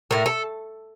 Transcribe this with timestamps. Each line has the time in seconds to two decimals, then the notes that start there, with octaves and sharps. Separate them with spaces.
0.11 A2 A3 A#4
0.26 A4